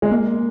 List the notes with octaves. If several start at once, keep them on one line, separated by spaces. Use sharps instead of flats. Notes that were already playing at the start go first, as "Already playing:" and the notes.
G#3
A#3